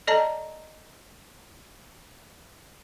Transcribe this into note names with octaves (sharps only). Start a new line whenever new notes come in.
A4 D5 D#5 A5 A#5